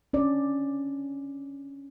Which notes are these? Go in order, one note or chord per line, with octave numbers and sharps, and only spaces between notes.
C#4 D4 D5